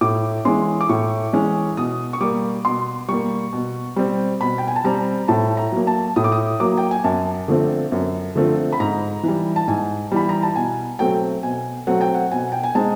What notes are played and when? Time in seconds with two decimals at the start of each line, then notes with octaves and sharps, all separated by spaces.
0.01 A2 D6
0.45 E3 G#3 C#4 C6
0.81 D6
0.89 A2 C#6
1.33 E3 G#3 C#4
1.77 B2 D#6
2.13 C#6
2.20 G3 A#3 D6
2.65 B2 C6
3.09 G3 A#3 C#6
3.53 B2
3.96 G3 C4
4.40 B2 B5
4.58 G5
4.68 G#5
4.76 A5
4.84 G3 C4 A#5
5.28 A2 A5
5.57 A#5
5.72 F#3 A#3
5.87 A5
6.16 A2 D#6
6.24 D6
6.32 D#6
6.60 F#3 A#3 D6
6.77 G5
6.91 G#5
7.04 F#2 A5
7.48 D3 F3 A3 C4
7.92 F#2
8.35 D3 F3 A3 C4
8.73 B5
8.80 G#2 A#5
9.23 E3 G3
9.56 A5
9.68 G#2 G#5
10.12 E3 G3 B5
10.29 A#5
10.43 A5
10.55 B2 G#5
10.99 F#3 A3 C4 G5
11.43 B2 G#5
11.87 F#3 A3 C4 F#5
12.01 G5
12.14 F#5
12.31 B2 G#5
12.52 G5
12.63 G#5
12.75 G#3 C4 D#4 A5